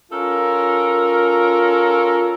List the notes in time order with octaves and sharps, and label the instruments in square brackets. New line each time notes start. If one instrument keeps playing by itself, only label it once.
[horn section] C#4 F4 A4 A#4